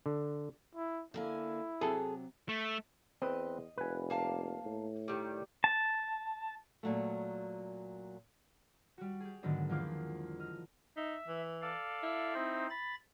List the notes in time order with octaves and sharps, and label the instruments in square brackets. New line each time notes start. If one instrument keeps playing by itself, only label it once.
[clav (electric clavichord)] D3
[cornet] E4
[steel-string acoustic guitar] D3 A#3 G#5 [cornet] E4
[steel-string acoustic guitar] C3 F#3 [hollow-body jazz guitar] G#4 A4
[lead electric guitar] A3
[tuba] E2 [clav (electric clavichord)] C4 B4 [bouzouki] D#5
[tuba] F1 [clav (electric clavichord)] B4 G#5
[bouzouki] A#3 F5 A5
[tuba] A2
[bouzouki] D#3 G3
[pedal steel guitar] A5
[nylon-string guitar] A#2 F#3 A3
[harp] G3 F#4
G4 G#4
G#2 D3 D#3 F#3 B3 D4
E2 F3 A#3 F4 D6
D#5 F6
[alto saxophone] D#4 [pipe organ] E5
[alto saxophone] E3
[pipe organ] A4 D5 F5
[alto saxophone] E4
[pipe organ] C4 D#4 C5
B5 A6